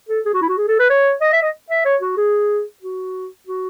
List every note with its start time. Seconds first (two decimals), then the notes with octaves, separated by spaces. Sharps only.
0.09 A4
0.25 G#4
0.34 F#4
0.42 E4
0.49 F#4
0.58 G#4
0.68 A4
0.79 B4
0.90 C#5
1.21 D#5
1.33 E5
1.42 D#5
1.70 E5
1.85 C#5
2.02 F#4
2.17 G#4
2.82 F#4
3.47 F#4